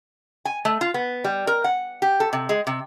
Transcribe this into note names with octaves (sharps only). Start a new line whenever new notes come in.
G#5
A3
F4
B3
G3
A#4
F#5
G4
A4
C3
G#3
C3